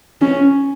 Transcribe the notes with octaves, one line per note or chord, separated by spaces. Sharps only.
C#4